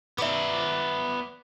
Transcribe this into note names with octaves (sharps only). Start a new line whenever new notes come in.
B3 D5 E5 D6